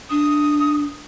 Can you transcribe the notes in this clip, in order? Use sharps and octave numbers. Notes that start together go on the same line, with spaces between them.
D4 D#6